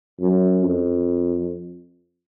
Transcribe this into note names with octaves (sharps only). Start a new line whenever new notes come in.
F#2
F2